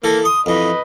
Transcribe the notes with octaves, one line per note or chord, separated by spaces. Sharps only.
E3 A#3 A4
C6 D#6
F2 E3 B4 D#5